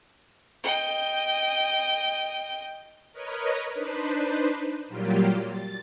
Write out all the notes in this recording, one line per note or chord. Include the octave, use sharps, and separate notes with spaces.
D#5 G5
A#4 B4 C#5 D#5
D4 D#4 B4 C5
A#2 F#3 G3 A#3 F4 G4
A6